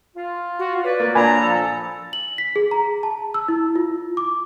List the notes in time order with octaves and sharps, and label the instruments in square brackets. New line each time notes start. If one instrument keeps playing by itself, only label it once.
[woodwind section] F4
[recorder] F#4
[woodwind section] F4 C#5 D5 [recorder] B4
[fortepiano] A#3
[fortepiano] A#2 D4 [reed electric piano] G#5 B5 [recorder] A#5
[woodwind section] F3 A4
[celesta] F#7
B6
G#4
A#5
A5
E6
E4
F4
D6